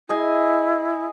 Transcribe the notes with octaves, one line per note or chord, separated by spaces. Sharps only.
E4 G#4 D#5 G#5